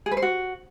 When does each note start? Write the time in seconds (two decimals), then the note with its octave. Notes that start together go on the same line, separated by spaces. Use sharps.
0.06 G#4
0.11 B4
0.17 C5
0.22 F#4